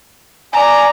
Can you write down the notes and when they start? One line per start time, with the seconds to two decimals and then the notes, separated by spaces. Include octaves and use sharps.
0.53 D5 G#5 A#5